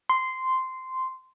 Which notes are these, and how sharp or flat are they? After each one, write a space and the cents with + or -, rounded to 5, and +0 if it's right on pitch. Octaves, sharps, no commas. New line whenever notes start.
C6 -10